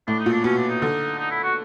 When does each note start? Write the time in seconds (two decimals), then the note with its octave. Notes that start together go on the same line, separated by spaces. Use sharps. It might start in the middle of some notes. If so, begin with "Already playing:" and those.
0.08 A2 D4
0.20 D#4
0.26 A#2
0.32 D4
0.44 B2 C#4
0.57 D4
0.69 D#4
0.82 D3
1.19 D#4
1.31 E4
1.43 F#4